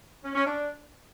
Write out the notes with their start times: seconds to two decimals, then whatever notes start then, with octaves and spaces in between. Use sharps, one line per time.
0.24 C#4
0.35 C#4
0.46 D4